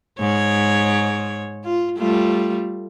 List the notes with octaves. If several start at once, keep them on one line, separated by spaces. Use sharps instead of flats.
G#2 C#5
F4
G3 A3 F4